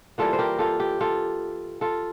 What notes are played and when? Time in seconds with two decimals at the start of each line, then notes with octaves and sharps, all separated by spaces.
0.18 E3 G3 A#3 F4 A4
0.33 C5
0.39 G4 A#4
0.59 F4 A4
0.80 G4
1.01 F4 A4
1.81 F4 A4